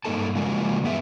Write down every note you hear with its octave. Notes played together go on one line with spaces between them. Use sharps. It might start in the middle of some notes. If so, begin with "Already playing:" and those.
G2 A#3 D#4 A4 A5
C#3 F3 G#3 A#3 F#4
G2 E3 B3 G#4 B4 E5